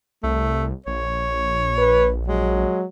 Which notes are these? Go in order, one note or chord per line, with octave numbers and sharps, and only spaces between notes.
C2 A3
A#1 C#5
B4
F#3 G#3